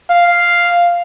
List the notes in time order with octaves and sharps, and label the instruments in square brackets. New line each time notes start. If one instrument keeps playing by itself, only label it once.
[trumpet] F5